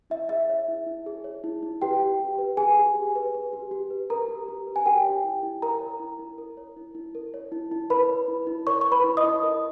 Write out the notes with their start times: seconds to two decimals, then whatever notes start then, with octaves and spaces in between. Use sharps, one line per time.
0.10 E4 E5
0.29 G#4 E5
0.49 C#5
0.68 E4
0.86 E4
1.06 G#4
1.24 C#5
1.44 E4
1.63 E4
1.82 G4 B4 G5
2.01 G4
2.20 G4
2.39 B4
2.57 G#4 B4 G#5
2.77 G4
2.96 G4
3.15 B4
3.34 B4
3.53 G4
3.71 G4
3.90 B4
4.10 A#4 B4 A#5
4.29 G4
4.49 G4
4.67 B4
4.76 G#5
4.85 G4 A#4 G5
5.05 C#5
5.24 E4
5.43 E4
5.62 A#4 A#5
5.80 C#5
6.00 E4
6.19 E4
6.38 A#4
6.57 C#5
6.77 E4
6.95 E4
7.15 A#4
7.34 C#5
7.52 E4
7.72 E4
7.90 A#4 B4 B5
8.09 C#5
8.28 E4
8.47 E4
8.67 A#4 C#5 C#6
8.81 C#5 C#6
8.92 B4 B5
9.04 E4
9.17 D#5 D#6
9.23 E4
9.43 A#4